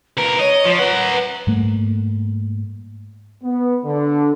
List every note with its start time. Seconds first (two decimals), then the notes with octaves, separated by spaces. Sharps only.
0.17 C#2 A#4 B4
0.39 C#5 D#5
0.65 F3
0.79 A#4 B4 F#5
1.47 G#2 G3 A3 A#3
3.44 B3
3.85 D3